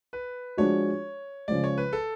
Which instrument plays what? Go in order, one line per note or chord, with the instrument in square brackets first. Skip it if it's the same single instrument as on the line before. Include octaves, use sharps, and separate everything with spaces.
[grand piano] B4
[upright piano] F3 G#3 D4 F#4 [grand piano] C#5
[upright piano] C#3 F3 G#3 [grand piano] D5
[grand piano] C#5
B4
A4